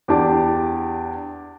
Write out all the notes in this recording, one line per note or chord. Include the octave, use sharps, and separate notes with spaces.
E2 D4 G4 A5 D6